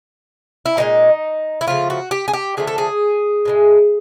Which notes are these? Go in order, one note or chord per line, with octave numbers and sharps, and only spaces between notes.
E4
A#2 F3 G#3 D#4
E4
C#3 F3 A3 F4
F#4
G4
G#4
G4
D3 F3 A3 G#4
A4
G#4
A2 E3 G#3